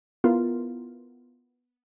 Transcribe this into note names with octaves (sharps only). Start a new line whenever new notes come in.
B3 E4 F4 A#4